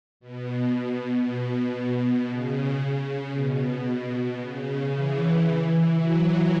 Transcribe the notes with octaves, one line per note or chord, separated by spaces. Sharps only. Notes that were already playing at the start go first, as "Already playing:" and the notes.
B2
B2
C#3
C#3
B2
B2
C#3
E3
F#3